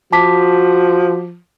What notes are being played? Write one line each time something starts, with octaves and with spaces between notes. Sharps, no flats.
F3 F#4 A5 D6 B6